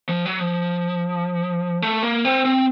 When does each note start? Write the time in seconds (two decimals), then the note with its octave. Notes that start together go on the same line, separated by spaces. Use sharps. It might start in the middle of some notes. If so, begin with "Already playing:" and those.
0.09 F3
0.26 F#3
0.40 F3
1.82 A3
2.03 A#3
2.25 C4
2.45 C4